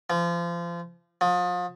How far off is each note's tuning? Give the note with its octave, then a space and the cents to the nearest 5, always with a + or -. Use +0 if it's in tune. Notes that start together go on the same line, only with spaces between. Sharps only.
F3 -30
F3 +35